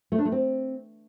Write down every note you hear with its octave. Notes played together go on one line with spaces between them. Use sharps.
A3
D4
A3
C4